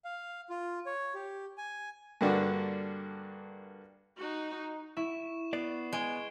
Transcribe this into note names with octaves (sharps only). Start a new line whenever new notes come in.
F5
F4
C#5
G4
G#5
G2 D3 A#3 D4 F#4
D#4 F#4
E4 C#6 E7
B3 D5 C7
G#3 G#6 D7 G7